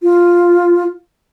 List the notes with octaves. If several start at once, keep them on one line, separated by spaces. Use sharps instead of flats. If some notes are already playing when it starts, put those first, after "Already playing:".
F4